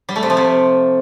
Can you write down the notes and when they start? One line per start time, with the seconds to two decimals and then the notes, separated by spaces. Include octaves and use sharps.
0.09 G3
0.16 A3
0.23 C3
0.30 F3
0.37 C3